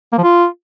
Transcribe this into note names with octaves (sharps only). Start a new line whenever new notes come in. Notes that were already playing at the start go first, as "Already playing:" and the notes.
A#3
F3
F4